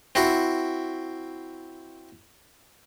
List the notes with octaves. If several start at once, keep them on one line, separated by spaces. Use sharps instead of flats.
C4 E4 F#4